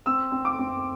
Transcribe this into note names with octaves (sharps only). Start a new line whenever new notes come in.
C4 E6
C4
D6
C4